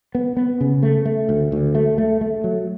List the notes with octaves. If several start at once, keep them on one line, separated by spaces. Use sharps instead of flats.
B3
B3
C#3
A3
A3
D2
D2
A3
A3
A3
F#3